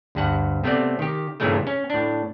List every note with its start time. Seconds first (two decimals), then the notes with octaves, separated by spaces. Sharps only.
0.15 D2 G2 F#5
0.64 C3 A3 B3 C4 D5
0.99 D#3 G4
1.40 G2 A#2 C#3 E3 G#3 A3
1.67 C#4
1.90 A2 D4